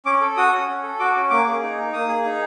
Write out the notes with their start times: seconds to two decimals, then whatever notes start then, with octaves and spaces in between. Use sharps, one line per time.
0.06 C#4 D6
0.21 A4
0.37 F#4 D#6
0.53 C#4
0.69 C#4
0.83 A4
0.99 F#4 D6
1.16 C#4
1.30 A#3 D6
1.47 G#4
1.62 D#4
1.78 A#3
1.93 A#3 D#6
2.08 G#4
2.25 D#4